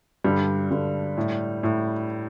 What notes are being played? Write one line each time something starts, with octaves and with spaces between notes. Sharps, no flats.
G2 D3 G3
G2 D3
A2
A2